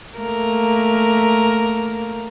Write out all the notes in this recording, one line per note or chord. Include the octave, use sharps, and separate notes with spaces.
A3 A#3 A#4